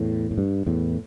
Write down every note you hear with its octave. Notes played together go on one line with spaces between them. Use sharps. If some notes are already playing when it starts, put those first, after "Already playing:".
Already playing: E2 A2
A2
G2
E2 A2